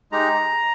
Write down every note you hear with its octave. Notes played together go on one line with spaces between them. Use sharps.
G#3 D#4 G4 A#5